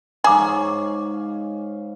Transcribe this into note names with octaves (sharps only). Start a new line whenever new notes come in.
G#2 G#4 C#5 F5 A#5 D6